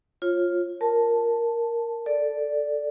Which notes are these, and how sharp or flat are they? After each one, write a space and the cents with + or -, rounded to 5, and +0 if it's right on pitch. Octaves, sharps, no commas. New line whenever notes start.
F4 +0 C#5 -30
A#4 +0 A5 +0
A4 +0 D5 +0